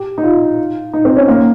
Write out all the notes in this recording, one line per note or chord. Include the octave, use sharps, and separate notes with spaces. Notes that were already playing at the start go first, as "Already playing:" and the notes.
Already playing: G4
D#4
F4
D#4
C4
C#4
A#3